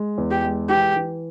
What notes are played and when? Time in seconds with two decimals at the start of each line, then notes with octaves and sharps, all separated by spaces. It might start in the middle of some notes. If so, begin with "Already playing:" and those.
Already playing: G#3
0.18 E2
0.31 G4
0.43 G#3
0.69 E3 G4
0.96 E3